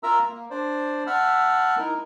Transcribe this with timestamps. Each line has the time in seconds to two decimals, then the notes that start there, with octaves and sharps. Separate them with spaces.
0.03 F4 A#4 E5 A#5 E6
0.29 A#3
0.51 D4 C5 D5
1.07 E5 F#5 A5 B5 E6 F6
1.77 D#4 E4 A#4